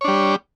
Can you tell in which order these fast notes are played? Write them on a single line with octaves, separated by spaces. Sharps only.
C#5 D4 G3